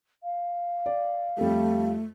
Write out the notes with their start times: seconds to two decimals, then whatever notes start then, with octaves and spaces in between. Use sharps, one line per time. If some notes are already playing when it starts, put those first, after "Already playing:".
0.23 F5
0.86 D5
1.38 F2 G3 A3 A4